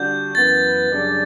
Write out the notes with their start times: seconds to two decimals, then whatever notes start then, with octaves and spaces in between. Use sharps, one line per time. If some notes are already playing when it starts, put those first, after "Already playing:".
Already playing: D3 G3 D4 F#4 G6
0.35 F#2 E3 B3 A6
0.89 F#2 C#3 G3 D4